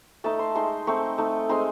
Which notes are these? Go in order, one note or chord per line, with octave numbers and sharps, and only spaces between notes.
A3 D#4 A5
C6
G#3 D#4 C6
A3 C4 D#4 C#6
A3 D#4
G#3 C4 D#4 C6